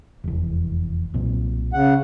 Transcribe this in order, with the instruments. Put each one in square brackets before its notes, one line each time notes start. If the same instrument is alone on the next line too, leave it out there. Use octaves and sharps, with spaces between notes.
[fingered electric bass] F1 E2
B1 A#2 C4
[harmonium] C#3 F#5